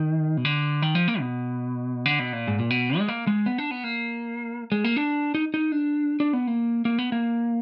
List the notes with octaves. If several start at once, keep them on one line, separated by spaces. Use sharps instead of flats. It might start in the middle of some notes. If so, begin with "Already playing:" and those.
Already playing: D#3
B2
D3
D#3
F3
A#3
B2
D3
B2
A#2
G#2
A#2
B2
G#3
A#3
G#3
B3
D4
B3
A#3
G#3
A#3
D4
D#4
D#4
D4
D4
B3
A#3
A#3
B3
A#3